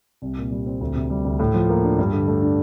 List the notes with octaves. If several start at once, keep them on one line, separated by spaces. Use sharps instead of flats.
C2
A#2
G3
C4
D2
C3
G3
D2
A2
F3
A#3
D4
G2
D3
A3
D4